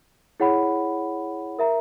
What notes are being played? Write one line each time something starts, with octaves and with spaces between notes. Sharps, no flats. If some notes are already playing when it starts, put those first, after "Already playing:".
E4 G#4 C#5 F#5 B5
A#4 E5 A#5